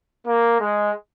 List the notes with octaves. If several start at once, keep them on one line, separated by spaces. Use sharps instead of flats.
A#3
G#3